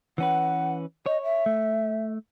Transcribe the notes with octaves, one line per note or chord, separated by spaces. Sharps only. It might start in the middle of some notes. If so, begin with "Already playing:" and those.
E3 C#4 B4 F#5
C#5 D#5
E5
A3